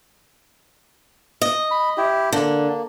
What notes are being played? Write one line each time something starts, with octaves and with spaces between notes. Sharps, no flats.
D#5
B5
E4 G4
D3 A#3